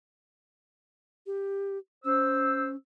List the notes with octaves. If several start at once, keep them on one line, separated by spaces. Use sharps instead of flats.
G4
C#4 C5 E6